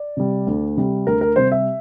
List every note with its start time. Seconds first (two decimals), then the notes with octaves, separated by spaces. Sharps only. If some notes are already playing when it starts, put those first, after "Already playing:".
Already playing: D5
0.17 C3 G3
0.47 D2
0.77 C3 G3
1.07 D2 A#4
1.21 A#4
1.36 C3 G3 C5
1.52 E5